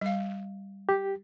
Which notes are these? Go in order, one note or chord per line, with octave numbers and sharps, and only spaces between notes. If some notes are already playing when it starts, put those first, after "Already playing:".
G3 F5
G4